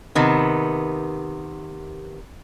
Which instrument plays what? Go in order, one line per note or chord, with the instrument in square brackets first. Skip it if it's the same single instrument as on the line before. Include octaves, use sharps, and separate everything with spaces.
[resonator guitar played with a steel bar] C3 D#3 B3